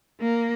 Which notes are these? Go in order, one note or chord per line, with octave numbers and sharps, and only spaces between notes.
A#3